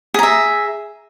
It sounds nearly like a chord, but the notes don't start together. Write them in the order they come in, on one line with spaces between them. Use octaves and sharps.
G#4 A#5 E5